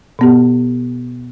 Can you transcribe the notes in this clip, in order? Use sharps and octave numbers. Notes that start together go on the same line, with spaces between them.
B2 B3 G4